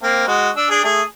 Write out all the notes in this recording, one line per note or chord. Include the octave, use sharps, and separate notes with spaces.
A#3 C4
G#3 F#4
D4 E6
D4 G#4 D5
A3 G#4